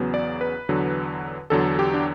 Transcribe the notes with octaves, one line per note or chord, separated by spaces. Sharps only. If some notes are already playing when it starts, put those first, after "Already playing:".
Already playing: E2 C#3 F#3 B3
D5
B4
E2 D3 F#3
E2 D3 F#3 A4
G4
D4